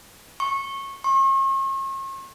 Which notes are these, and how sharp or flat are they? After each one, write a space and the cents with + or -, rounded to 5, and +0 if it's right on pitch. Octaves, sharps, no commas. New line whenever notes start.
C#6 -20
C#6 -45